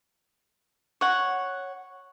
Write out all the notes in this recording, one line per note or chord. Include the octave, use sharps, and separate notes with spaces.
C#5 F#5